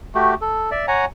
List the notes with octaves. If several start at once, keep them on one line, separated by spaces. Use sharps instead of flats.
A3 F#4 G4
A4
D5 E5
C#5 F#5 G#5 A#5